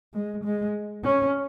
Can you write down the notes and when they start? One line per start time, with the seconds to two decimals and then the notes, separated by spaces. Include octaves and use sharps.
0.14 G#3
0.44 G#3
1.04 C#4